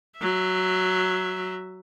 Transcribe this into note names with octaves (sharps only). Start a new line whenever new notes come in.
F#3 E5